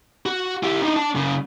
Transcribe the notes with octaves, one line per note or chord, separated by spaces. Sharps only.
F#4
E4 G4
D4 D#4
D4 A5
F#2 C#3